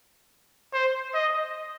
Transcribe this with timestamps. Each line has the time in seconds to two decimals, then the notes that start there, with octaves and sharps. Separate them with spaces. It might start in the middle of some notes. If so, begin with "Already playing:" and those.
0.73 C5
1.14 D#5